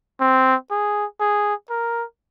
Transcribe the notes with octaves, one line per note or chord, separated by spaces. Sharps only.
C4
G#4
G#4
A#4